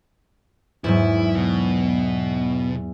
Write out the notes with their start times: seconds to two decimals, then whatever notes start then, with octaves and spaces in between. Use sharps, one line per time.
0.84 E2 G#2 F#3 E4
1.36 B2